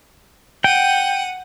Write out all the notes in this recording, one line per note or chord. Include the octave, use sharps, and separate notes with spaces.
F#5 G5 D#7